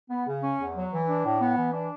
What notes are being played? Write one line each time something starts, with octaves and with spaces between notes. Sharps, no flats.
B3
C#3
C#4
E2
F#3
E3
D4
A2
B3
E3
D4